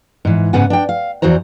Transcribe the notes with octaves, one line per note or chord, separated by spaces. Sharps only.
G#2 E3
G#2 C#3 B3 F#5 G#5
D4 G5
F5
E2 E3 F#4 C5 A#5